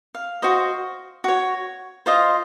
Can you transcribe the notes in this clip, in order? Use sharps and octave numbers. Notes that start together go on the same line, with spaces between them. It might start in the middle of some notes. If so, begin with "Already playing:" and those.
F5
F#4 C5 D#5
F#4 C#5
F4 C5 D#5 F5